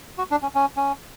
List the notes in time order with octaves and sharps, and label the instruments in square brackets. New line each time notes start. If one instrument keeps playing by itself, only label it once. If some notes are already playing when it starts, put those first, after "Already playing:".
[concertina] F#4
D4
C#4
C#4
C#4